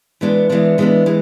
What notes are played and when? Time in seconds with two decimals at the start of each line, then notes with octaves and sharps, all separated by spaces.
0.21 E3 G#3 B3 D4
0.50 E3 G#3 B3 D4
0.78 E3 G#3 B3 D4
1.06 E3 G#3